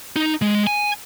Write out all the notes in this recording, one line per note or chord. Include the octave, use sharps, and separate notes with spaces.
D#4
G#3
G#5